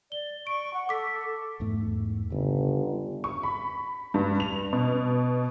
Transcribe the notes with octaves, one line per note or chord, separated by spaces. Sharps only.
D5 G7
C#6 D7
F#5
A4 D6 B6
E2 G#2 A3
G1 C#3
C#6
B5
G2
F7
B2